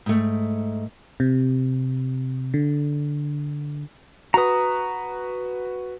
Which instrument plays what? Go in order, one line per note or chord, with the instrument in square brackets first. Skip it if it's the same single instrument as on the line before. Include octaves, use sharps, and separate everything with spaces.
[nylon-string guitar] G#2 A3
[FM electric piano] C3
D3
[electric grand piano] F#4 B4 [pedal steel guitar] A#5 D#6